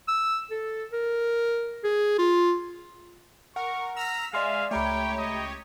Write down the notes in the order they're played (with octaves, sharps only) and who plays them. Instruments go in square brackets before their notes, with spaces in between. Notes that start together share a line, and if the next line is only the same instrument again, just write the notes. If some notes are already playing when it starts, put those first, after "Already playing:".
[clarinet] E6
A4
A#4
G#4
F4
[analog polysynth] A#4 [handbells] F#5 [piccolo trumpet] C#6
[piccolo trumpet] A#5 [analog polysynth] E6 F6 B6
[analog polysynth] G#3 G#4 E5 [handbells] D5 C6 F6 [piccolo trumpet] F5
[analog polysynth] C#2 G4 C#5 [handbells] A3 A#5 B5 [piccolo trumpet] G5
[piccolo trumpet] D#5